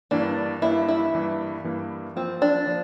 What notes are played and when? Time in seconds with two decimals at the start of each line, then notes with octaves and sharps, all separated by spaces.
0.11 G2 E3 A#3 D4
0.62 G2 E3 A#3 E4
0.88 E4
1.14 G2 E3 A#3
1.64 G2 E3 A#3
2.16 F3 A#3 C4 F4 C5
2.42 D4
2.67 F3 A#3 F4 C5